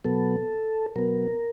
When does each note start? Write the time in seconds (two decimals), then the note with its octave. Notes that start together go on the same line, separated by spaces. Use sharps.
0.04 B2 F#3 B3 A4
0.96 B2 F#3 B3 A#4